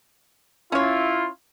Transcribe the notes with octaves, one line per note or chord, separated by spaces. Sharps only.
C#4 E4 F4 C#5